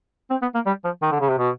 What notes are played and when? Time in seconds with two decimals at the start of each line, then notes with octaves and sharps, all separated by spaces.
0.30 C4
0.42 B3
0.55 A#3
0.66 G3
0.84 F3
1.02 D#3
1.12 D3
1.21 C#3
1.29 C3
1.39 B2